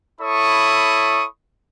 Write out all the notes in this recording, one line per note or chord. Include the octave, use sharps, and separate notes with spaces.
E4 A4 C#5 B5 C#6 D#6